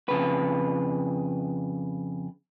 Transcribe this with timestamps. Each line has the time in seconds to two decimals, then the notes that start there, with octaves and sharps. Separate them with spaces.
0.08 F2 C#3 B4